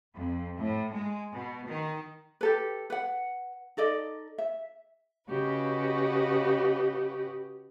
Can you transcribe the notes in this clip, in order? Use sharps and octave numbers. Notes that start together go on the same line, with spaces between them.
F2
A2
G#3
B2
D#3
G4 A4 B4
B4 F#5
D#4 A4 D5 D#5
E5
C#3 F#4 G4 B4 D#5